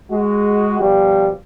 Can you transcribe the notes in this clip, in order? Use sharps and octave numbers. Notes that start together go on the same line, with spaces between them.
G#3 F#4
B2 F3 G3